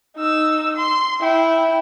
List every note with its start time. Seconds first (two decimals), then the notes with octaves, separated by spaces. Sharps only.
0.17 D#4 E6
0.77 C6
1.21 E4 G5